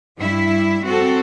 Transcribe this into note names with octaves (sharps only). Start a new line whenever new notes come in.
G2 G3 E4 E5
C4 F#4 A4